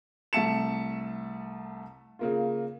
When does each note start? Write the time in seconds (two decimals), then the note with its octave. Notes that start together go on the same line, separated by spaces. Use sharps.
0.33 C2 A3 E5 A5 C#7 E7
2.19 C#3 A#3 F4